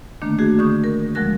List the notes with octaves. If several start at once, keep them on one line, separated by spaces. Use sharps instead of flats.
D3 D#3 A3 A#3 D4
A3 F#4 G#4
D3 C#6 D#6 G6
A#4
D2 F3 G#3 A#4 F#6 A#6